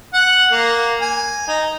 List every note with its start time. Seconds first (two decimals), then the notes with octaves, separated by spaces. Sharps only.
0.14 F#5
0.51 A#3
1.01 G#5
1.48 D#4